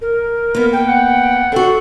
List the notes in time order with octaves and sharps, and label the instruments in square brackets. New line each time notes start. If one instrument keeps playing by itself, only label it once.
[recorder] A#4
[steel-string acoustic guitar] A#3 B3
[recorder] G5
[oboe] F#5
[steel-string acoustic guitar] D4 F#4 [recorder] A4